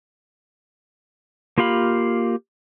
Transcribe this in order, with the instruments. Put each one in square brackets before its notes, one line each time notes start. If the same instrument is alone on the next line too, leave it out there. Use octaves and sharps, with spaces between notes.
[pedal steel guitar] A#3 F4 G4 F5 B5